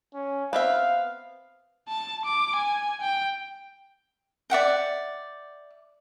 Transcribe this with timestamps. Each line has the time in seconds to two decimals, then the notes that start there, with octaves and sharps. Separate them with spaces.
0.14 C#4
0.53 B3 C4 E5 F5
1.89 A5
2.25 D6
2.56 G#5
3.01 G5
4.50 D5 E5 F#5 G5